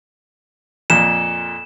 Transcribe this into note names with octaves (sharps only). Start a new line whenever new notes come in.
F2 A#2 E7